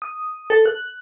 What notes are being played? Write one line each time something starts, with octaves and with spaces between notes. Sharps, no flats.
D#6
A4
F#6